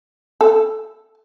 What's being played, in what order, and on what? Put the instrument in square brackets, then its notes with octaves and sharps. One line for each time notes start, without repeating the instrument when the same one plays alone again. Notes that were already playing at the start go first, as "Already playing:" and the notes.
[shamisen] A4